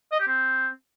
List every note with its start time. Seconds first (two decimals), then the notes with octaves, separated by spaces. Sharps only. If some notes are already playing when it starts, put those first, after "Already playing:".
0.12 D#5
0.20 G4
0.27 C4